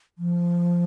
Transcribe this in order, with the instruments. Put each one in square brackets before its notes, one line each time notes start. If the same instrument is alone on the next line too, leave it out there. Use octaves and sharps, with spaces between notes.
[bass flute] F3